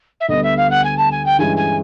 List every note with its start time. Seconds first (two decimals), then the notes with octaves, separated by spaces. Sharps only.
0.20 E5
0.28 D2 D3 G3 B3 D#5
0.43 E5
0.57 F5
0.70 F#5
0.84 G#5
0.97 A5
1.11 G#5
1.25 G5
1.39 G2 E3 G#3 C#4 E4 G#5
1.56 G#5